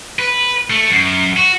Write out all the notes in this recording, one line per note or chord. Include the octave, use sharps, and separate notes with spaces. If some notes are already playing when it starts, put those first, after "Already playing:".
B4
A3
F#2
F#4